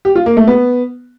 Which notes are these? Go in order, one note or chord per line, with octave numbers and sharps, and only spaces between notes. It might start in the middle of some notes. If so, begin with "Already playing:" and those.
G4
F4
A#3
A3
B3